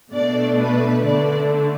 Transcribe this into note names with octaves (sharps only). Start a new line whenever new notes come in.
B2 A3 D4 D5
B4
D3 A3 D4 D5